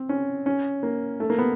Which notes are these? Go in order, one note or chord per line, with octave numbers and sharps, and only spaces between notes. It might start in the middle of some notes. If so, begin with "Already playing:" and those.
Already playing: C4
C#4
C#4
A#3
A3
A#3
B3